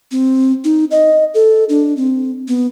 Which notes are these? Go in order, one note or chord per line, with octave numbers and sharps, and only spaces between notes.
C4
D#4
D#5
A4
D4
C4
B3